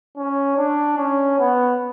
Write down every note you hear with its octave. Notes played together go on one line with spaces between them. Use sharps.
C#4
D4
C#4
B3